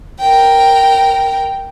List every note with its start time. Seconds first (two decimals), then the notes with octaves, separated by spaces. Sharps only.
0.20 A#4 G5